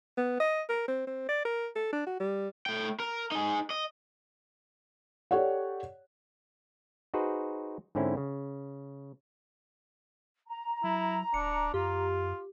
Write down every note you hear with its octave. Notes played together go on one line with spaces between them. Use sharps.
B3
D#5
A#4
C4
C4
D5
A#4
A4
D4
F#4
G3
A3 G5
A#4
D#4 G#4
D#5
G4 A4 C#5 D5 F#5
D#4 F#4 G#4 B4 C5
G#2 D3 C4 C#4 E4
C#3
A#5
F#3 E4
D1 D4 C#7
F#2 F4 G4